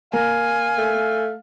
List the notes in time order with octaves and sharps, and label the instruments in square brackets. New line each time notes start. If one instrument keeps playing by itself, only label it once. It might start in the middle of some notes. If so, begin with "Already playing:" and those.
[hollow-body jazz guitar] A#3 [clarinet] F5 [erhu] G#5
[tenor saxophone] A3